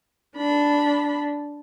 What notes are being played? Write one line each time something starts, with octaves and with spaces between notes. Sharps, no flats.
D4 B5